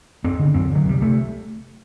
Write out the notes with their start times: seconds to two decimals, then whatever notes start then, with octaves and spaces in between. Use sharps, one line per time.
0.24 F#2 C4
0.39 D3
0.54 F#2 C4
0.70 D3
0.75 F#3
0.85 C2 G3
1.01 C3 A3